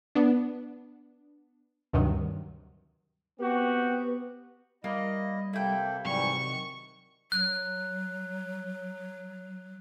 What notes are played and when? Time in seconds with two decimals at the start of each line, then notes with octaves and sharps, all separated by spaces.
0.15 B3 D4
1.93 D2 G2 C3 D#3 F#3
3.39 B3 C4 F#4 G4
4.84 G3 A#3 E4 D#5
5.53 C3 A#3 E4 A4 G5
6.05 G#2 C3 E3 F#3 G3 C#6
6.39 D#3
7.32 F#3 F#6